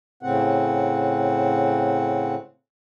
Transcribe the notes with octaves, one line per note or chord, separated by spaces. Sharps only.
A2 C#3 C4 F#5